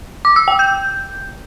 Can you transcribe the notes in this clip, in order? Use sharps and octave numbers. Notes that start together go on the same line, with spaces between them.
D6
E6
G5
G6